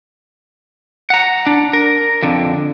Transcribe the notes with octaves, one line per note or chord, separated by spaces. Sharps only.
F#5 A#5
D4
A#4
F2 D3